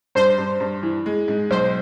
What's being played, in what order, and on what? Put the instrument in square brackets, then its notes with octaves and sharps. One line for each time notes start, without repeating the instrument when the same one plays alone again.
[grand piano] G2 [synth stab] C5
[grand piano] G2
G2
E3
G#3
G#2
[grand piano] B1 [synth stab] C5